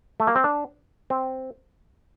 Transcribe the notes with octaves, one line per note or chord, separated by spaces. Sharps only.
A3
A#3
C4
D4
C4